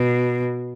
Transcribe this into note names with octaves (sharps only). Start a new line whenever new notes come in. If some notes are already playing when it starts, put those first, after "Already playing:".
Already playing: B2